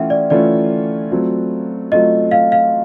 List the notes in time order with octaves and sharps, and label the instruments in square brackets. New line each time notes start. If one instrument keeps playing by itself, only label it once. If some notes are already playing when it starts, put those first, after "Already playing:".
Already playing: [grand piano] E3 A3 C#4 F4 [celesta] E5 F#5 G5
[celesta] D5
[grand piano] E3 A3 C#4 F4 [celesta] D5
[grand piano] F#3 A3 C4 F4
[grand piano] F#3 A3 C4 F4 [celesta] D#5
[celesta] F5
F5